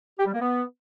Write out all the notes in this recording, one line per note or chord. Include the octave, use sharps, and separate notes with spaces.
G4
G3
A#3
B3